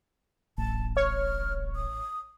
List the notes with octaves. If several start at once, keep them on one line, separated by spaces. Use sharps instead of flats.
D1 A1 A5
C#5 F6
D#6